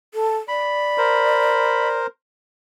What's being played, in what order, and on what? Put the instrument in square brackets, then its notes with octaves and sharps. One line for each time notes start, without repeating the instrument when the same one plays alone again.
[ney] A4
[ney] D5 [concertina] B5
[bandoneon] A#4 C5